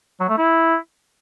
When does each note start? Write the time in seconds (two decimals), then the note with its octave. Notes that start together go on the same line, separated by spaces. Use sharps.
0.20 F#3
0.29 A3
0.38 E4